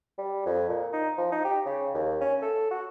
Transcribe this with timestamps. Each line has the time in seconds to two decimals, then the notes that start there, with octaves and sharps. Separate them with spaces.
0.18 G3
0.46 F2
0.69 A#2
0.93 D#4
1.18 F3
1.32 D#4
1.45 G4
1.65 C#3
1.94 D#2
2.21 C#4
2.42 A4
2.71 F#4